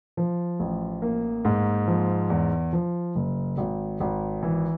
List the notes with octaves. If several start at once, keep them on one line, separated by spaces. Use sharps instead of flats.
F3
A1
A#3
G#2
F3
E2
F3
F#1
G#1
G#1
E3